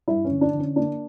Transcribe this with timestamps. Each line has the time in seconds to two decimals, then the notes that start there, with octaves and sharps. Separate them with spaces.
0.08 G2 E4
0.25 C#4
0.31 D3
0.41 D4
0.53 D3
0.59 C#4
0.76 A#3 D4